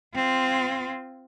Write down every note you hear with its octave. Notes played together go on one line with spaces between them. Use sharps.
C4 F4